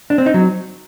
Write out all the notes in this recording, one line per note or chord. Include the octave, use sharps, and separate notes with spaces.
D4
C4
D#4
F#3